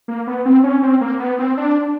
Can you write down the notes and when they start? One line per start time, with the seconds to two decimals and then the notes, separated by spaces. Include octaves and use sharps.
0.08 A#3
0.27 B3
0.45 C4
0.64 C#4
0.83 C4
1.01 A#3
1.20 B3
1.39 C4
1.57 D4